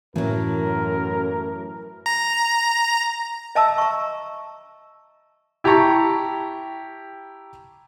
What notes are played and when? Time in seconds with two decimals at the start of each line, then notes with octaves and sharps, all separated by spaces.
0.16 F#2 A2 E3 F#3 C#4 A#4
2.06 A#5
3.55 D#5 E5 A5 A#5 D6 E6
3.78 A#5 C#6
5.64 E4 G4 G5 A5 A#5 C#6